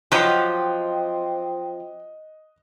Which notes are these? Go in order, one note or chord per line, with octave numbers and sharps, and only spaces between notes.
F3 F#3 C4 F#4 G4 D#5 F#6